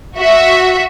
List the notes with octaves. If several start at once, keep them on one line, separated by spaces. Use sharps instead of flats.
F#4 E5